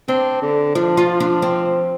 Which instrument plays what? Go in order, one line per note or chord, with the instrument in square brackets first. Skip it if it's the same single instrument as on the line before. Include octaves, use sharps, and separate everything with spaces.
[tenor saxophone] C4 [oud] D4
[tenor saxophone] D3
[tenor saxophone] F3 [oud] D4
[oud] F4
D4
C4